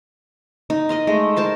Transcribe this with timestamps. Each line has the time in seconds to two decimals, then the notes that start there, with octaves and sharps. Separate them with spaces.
0.70 D#4
0.89 A#4 D#5 A#5 C6
1.07 G#3 A3
1.36 A#4 C5 A5 C6